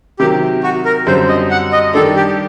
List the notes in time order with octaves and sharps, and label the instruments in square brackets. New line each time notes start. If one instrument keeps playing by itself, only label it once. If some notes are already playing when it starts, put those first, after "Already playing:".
[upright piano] C3 D#3 F#3 [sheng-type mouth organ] G4
[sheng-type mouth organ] F#4
A#4
[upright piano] F#2 D3 G3 C4 [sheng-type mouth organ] C5
[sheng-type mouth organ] D#5
F#5
D#5
[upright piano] D#3 G3 D4 [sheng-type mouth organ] A4
[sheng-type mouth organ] G4